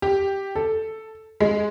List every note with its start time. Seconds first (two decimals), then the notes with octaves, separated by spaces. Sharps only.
0.02 G4
0.56 A4
1.41 G#3